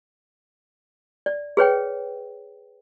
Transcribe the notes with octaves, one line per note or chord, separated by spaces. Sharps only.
D5
G#4 B4 C#5 G5